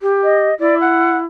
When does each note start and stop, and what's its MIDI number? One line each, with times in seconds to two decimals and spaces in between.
0.01 0.50 67
0.23 0.54 75
0.59 1.24 64
0.59 0.75 74
0.80 1.16 78